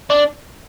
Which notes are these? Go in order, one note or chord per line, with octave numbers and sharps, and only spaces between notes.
D4